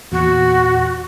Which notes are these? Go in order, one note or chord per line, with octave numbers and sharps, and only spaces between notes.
E2 A#2 F#4